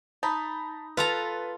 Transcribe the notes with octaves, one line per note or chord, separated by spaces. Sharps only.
D#4 A5 B5
F4 A4 B4 A#5